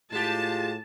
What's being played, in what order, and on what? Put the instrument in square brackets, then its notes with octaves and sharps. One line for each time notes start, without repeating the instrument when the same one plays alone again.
[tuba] A2 [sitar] G#3 G4 [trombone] F4 [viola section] A5